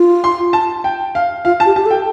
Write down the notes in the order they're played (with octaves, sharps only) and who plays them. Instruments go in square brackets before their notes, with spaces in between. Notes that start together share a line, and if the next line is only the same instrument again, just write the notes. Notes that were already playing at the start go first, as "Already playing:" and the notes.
Already playing: [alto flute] F4
[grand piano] C6
A5
G5
F5
[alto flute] F4 [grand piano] F5
[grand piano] A5
[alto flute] G4
[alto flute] G4 [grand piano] A5
[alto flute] A4
[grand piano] G5